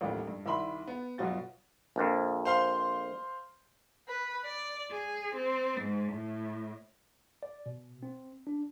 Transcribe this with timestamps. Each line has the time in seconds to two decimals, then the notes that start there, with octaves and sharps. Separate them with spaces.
0.01 A1 D#2 A2 F3 G3 A3
0.27 G2
0.46 C2 D#3 E5 B5 C6 F#7
0.87 B3
1.18 G1 B2 F#3 F4 F#4 A6
1.96 A#1 F2
2.45 C5 F5 C6
4.07 B4
4.44 D5
4.92 G#4
5.36 C4
5.81 G#2
6.12 A2
7.43 D5
7.66 B2
8.03 C4
8.47 D4